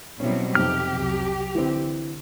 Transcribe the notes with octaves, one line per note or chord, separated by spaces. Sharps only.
B2 F#3 G3 C4 C#4 E4
F2 C3 D#4 G4 F6
C2 F#3
D3 E3 C4